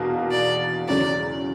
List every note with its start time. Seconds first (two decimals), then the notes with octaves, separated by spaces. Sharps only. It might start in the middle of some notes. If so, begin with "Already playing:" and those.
Already playing: E2 B2 A#3 D4 F#4
0.31 D5
0.88 E2 C#3 F#3 C#4 D5